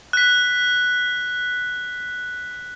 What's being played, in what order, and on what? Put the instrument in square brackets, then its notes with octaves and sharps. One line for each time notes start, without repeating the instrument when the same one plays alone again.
[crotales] F#6 B6